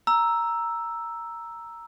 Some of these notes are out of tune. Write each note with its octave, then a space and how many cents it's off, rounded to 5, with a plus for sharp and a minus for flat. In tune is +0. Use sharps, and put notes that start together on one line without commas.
A#5 +0 E6 +0